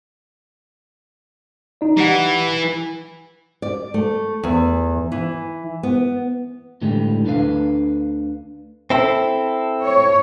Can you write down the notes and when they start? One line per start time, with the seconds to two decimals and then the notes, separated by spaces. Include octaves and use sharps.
1.81 D#4 D5
1.98 E3 G4 F#5
3.62 D5
3.94 A3
4.43 E2
5.12 E3
5.83 B3
6.82 A2 D3 E3 G3 G#3
7.25 D2 D3 D4 B4 F5
8.90 C4 E4 A4
9.85 C#5